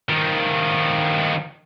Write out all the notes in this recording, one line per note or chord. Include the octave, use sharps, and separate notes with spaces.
D#3 F3